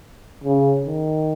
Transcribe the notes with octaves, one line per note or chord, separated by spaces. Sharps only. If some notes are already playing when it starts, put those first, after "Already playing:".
C#3
D#3